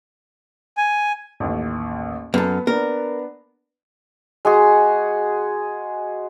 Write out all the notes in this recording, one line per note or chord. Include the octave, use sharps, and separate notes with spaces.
G#5
A1 D#2
F#2 B3 A4
B3 D4 A#4
G#3 F#4 G#4